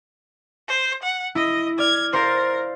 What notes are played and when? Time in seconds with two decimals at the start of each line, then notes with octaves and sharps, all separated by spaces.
0.68 C5
1.03 F#5
1.35 E4 D#5
1.79 D5 F6 G#6
2.13 A#4 C5 F5 A6